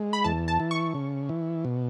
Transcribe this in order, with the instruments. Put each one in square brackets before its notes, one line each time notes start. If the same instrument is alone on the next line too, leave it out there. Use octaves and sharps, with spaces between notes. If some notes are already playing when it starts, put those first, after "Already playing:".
Already playing: [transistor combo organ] G#3
[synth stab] B5
[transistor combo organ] E2 [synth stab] A5
[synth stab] A5
[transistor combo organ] E3
[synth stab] C#6
[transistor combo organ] C#3
E3
B2